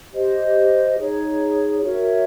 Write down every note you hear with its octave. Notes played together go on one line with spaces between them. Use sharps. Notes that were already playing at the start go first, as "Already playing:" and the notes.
G4 C5 D#5
D#4 G#4 C#5
F#4 A#4 C#5 E5